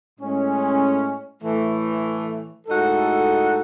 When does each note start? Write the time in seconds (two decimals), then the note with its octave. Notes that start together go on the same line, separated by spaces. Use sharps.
0.19 A2 G#3 C#4
1.43 A2 E3 A3
2.67 A2 G#3 D#4 F#4 A4